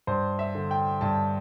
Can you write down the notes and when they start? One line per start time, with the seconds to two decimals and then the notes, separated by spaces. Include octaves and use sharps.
0.07 G2 C5
0.39 E5
0.55 D3
0.71 G5
1.01 G2 A5